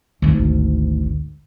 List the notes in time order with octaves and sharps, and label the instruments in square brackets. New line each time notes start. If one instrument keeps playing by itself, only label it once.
[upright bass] G#1 D2